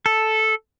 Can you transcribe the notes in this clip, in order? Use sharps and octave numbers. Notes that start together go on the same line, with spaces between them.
A4